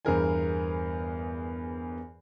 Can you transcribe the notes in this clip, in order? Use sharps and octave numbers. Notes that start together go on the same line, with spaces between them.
E2 G2 G#4 A#4 C5 G#5